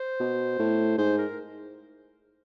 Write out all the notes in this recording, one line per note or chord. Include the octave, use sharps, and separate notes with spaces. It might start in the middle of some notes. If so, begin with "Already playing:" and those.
Already playing: C5
B2
A2
G#2 C5
A#4